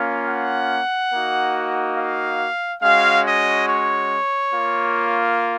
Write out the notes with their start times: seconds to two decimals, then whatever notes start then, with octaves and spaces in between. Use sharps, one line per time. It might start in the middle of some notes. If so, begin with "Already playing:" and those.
Already playing: A#3 C#4 F4
0.28 F#5
1.13 A#3 D#4 F#4
1.97 F5
2.82 G#3 C#4 F#4 F5
3.25 D#5
3.67 C#5
4.52 A#3 F4